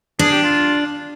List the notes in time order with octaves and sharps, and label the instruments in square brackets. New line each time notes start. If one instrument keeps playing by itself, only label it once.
[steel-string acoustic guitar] D4 [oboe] G#4
[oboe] G4
F4